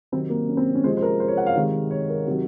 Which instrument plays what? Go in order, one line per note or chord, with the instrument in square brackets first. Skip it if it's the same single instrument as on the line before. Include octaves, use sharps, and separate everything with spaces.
[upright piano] C3 D#3 F#3 C4
A#3
C#4
C4
C#4
C3 F3 G#3 C5
C5
A#4
C5
C#5
F#5
F5
C3 D#3 G#3
C#5
A#4
C3 D#3 F#3